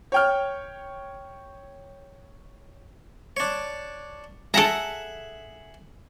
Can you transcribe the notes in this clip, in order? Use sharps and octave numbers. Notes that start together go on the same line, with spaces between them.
C#5 G5 F6
D4 C#5
G#4 A4 E5 F#5 A#5